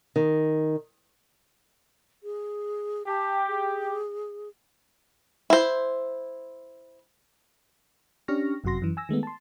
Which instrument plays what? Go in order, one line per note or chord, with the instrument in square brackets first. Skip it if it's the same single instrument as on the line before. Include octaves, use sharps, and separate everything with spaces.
[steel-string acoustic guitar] D#3
[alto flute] G#4
[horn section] G4 [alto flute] A5
[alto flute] G#4
[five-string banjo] E4 C5
[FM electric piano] C#4 D4 G4 C#6 F6 A#6
G1 F#2 C3 F#4 C6 A#6
F#2 E3
G#5 E6 A#6
D#3 G#3 A3 B3
A5 C6